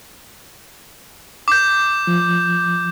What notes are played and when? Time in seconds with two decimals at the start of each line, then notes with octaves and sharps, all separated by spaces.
1.48 D6 G6
2.07 F3